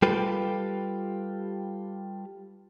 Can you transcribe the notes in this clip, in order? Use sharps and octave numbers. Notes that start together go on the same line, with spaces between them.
G3 F4 G4 A4 B4